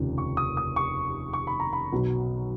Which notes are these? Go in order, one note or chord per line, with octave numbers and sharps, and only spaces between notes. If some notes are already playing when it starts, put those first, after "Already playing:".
Already playing: F1 D#2 C#3 F3
C#6
D#6
D#6
C#6
C#6
B5
A#5
B5
B1 B2 F#3